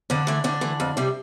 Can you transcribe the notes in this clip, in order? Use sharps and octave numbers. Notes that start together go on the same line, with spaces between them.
F2 D3 D4
E3 A3
F2 D3 D4
E3 A3
F2
C3 G3